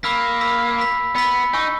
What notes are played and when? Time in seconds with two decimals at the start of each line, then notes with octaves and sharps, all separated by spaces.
0.03 A#3 B5 E6 B6
0.41 B5 E6 B6
0.78 B5 E6 B6
1.16 B3 B5 E6 B6
1.53 D#4 G#5 C#6 E6